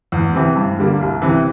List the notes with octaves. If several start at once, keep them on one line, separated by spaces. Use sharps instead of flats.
E2
C3 E3
G2
D3 G3 A#3
C2
C3 E3